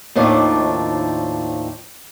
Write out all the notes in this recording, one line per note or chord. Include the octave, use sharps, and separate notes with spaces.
D#2 A2 D#3 F3 D4